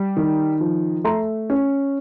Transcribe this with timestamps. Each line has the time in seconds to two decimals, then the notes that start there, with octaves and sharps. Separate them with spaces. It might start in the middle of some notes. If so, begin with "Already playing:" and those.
Already playing: G3
0.17 D#3
0.61 F3
1.04 A3 A#5 C6
1.50 C#4